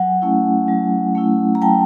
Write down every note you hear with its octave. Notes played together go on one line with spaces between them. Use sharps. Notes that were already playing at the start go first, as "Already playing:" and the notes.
Already playing: F#3 F#5 G#5
A3 C#4 E4
F#3
A3 C#4 E4
A#5
F#3 G5 A5